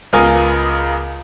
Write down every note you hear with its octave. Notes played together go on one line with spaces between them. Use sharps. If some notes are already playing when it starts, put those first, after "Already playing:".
C#2 B3 F4 A#4 G#5 D#6